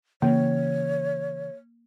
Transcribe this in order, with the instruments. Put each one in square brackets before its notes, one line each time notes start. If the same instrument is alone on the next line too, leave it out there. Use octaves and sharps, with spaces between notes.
[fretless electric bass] C#3 E3 [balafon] A#3 [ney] C#5